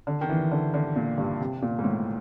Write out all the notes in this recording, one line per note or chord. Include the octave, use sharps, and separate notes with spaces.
D3
D#3
E3
D3
D3
A#2
G2
C3
A#2
G#2
A2